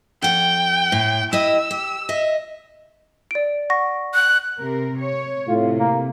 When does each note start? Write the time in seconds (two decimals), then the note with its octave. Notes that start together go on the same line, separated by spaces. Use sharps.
0.22 F2 F#5 G5
0.92 A2
1.33 E4 G4 D#5 E6
1.71 G4
2.09 D#5 E5
3.31 D5 D7
3.70 F#5 C#6 A#6
4.14 F#6
4.58 C3 A#4
4.97 C#5
5.48 A2 C3 F4
5.79 A#3